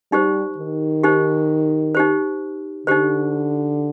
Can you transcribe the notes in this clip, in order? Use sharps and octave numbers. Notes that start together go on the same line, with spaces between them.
G3 D#4 G4 C5
D#3
D#4 G4 C5
D#4 G4 C5
D3 D#4 G4 C5